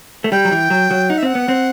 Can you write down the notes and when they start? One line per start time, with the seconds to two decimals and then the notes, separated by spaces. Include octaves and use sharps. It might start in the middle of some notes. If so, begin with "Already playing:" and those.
0.24 A3
0.32 G3 G5
0.45 F#3
0.51 E3
0.70 F#3
0.91 F#3
1.10 D#4 F#5
1.18 E5
1.23 C4 F#5
1.35 B3
1.48 C4